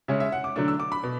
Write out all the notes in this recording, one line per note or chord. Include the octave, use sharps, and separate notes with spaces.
C#3 G#3 C#4 E5
E5
F#5
D6
D3 F#3 A3 D4 D6
E6
D6
B5
B2